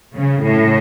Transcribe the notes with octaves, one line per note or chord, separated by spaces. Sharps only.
C#3
A2